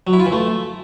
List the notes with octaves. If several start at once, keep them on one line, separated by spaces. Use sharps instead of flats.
F#3
E4
F4
E3
A3